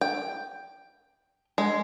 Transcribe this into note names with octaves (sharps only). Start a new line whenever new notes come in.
G5
G#3